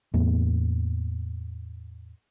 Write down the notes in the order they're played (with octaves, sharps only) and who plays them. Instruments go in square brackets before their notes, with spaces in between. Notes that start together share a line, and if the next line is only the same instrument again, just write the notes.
[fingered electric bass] E2 A2 A#3 B3